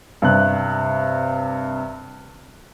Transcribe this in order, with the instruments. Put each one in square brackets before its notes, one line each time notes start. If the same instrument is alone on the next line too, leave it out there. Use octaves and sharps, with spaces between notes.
[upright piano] G2 C3 F#6